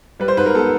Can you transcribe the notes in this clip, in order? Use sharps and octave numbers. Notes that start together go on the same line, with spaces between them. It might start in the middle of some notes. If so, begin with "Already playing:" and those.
G3 B4
C5
G#2 B4
A#4
B3 A4